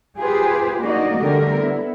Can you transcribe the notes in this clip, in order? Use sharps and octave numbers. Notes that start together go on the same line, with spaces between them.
F4 G4 G#4 B4 C5
A#3 D4 D#4 F#4 D5 D#5
D3 G3 A3 G4 A#4
B3 E4